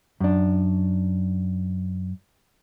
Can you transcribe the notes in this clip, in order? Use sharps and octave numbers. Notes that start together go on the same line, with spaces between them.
F#2 D4